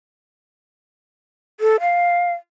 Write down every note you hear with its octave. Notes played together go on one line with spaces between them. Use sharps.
A4
F5